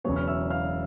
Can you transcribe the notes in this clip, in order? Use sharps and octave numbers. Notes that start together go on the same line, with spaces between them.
E1 E2 C#3 F#3 B3 C#5 C#6
F6
E5 E6
F5 F6